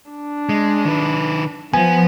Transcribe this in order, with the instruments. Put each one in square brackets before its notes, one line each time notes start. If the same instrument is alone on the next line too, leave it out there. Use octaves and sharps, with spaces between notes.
[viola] D4
[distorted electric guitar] G#3
D#3 B4
[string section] F3 [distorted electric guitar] B3 [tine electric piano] G#5